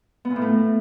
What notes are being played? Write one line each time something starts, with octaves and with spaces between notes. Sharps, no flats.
B3
A#2
A2
A3